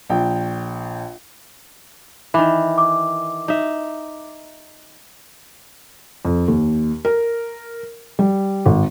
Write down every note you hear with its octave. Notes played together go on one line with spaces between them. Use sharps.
A#1 G5
D#3 E3 B5 D6
D6
D#4 E5
F2
D#2
A#4
G3
G#1